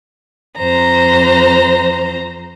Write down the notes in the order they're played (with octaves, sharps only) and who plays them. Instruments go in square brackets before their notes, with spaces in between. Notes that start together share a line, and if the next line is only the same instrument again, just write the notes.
[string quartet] F2 C5 A#5